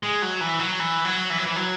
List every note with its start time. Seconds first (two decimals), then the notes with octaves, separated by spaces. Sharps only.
0.03 G#3
0.22 F#3
0.41 E3
0.59 F#3
0.80 E3
1.05 F#3
1.30 E3
1.38 F#3
1.46 E3
1.56 F#3